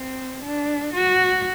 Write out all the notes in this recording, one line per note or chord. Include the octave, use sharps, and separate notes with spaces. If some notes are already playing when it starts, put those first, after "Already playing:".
Already playing: C4
D4
F#4